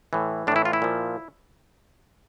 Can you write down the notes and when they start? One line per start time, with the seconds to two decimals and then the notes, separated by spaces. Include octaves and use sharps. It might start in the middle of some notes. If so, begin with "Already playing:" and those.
0.13 A2 E3
0.47 A2 D4
0.52 E3 E4
0.65 F4
0.73 E4
0.82 A#2 F3